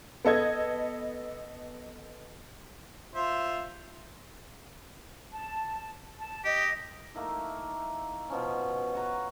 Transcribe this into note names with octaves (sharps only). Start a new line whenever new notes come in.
B3 A4 D#5 G#6
F4 C5 E5
A5
A5
G4 D#5
A3 A#3 D#4 E4
B2 F3 C#4
F#4 B4 A#5